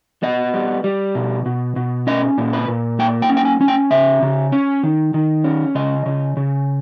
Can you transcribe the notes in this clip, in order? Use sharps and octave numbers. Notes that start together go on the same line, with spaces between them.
B3 D#5
G3
G3
B2
B2
B2
C#4 D#5
A#2
B4
A#2
A#3 G5
G5
C#4
G5
G#5
C#4
G5
C#3 E5
C#3
C#4
D#3
D#3
C#4
C#3 D#5
C#3
C#3